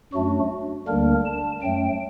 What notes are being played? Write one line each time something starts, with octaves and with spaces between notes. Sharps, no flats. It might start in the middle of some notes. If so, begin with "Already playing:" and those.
F#2 F#3 A3 D4 F#4
D2 D3 G3 A#3 D4 A#4
A5
F#2 F#3 A3 G5